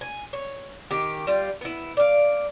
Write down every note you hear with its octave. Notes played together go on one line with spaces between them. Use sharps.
G#5
C#5
D#3 G4
G3 F4
B3 E4
D5 F5